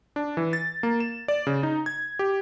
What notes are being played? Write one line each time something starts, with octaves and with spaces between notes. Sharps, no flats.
D4
E3
A6
A#3
E7
D5
C#3
D#4
G#6
G4